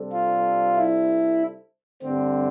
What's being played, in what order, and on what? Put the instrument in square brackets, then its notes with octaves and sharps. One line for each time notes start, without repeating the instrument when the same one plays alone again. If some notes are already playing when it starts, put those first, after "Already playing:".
Already playing: [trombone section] C3 G3 D4 A4 C5
[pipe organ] F4
E4
[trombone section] G2 D3 A3 [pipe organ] C4